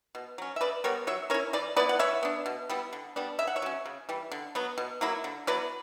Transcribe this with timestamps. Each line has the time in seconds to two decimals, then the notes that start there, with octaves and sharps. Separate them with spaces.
0.15 B2
0.38 F#3 C#4
0.56 E5
0.61 C#3 B4 D5
0.84 G3 B3 A#4 C#5
1.07 F#3 C#5 E5
1.30 C#4 A#4 C#5
1.34 E4
1.53 E3 B4 D5
1.76 B3 B4 D5
1.79 E4
1.89 F#5
1.99 E3 C#5 E5
2.23 B3 D4
2.46 B2
2.69 G3 B3 E4
2.93 D3
3.16 G3 B3 D4
3.39 C#3 E5
3.47 F#5
3.56 C#5 E5
3.62 F#3 C#4
3.86 C#3
4.09 E3 G3
4.32 D3
4.55 F#3 B3
4.78 B2
5.01 F#3 A#3 E4
5.24 D3
5.47 F#3 B3 E4 B4 D5